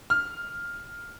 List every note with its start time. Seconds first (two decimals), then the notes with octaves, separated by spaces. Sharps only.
0.10 F6